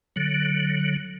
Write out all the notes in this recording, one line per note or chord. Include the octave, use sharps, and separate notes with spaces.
D3 F#3